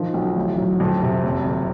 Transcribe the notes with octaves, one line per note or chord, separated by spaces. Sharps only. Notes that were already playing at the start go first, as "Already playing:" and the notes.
Already playing: D#3 F3
B1
A1
F#3
F2
C3
F#1
F2